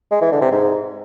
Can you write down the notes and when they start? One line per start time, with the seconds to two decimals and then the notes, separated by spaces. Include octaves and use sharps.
0.11 G#3
0.22 E3
0.32 D3
0.42 C3
0.52 G#2